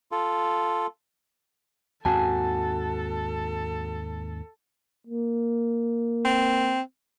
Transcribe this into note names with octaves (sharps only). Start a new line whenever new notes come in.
F4 A4
D#2 G#2 C4 F#4 A4 G#5 A5
A#3
C4